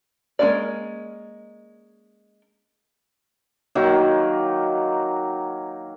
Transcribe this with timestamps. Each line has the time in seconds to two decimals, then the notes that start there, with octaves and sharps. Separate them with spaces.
0.39 G#3 A#3 C#4 A#4 D5
3.75 D#3 F#3 A#3